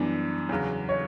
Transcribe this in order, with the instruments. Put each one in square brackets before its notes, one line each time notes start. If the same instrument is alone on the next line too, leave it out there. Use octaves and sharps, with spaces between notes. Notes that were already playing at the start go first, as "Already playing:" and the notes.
Already playing: [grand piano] F#2 E3 G3 [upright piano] B3 D4
[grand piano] E2 C#3 F#3
[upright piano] C#5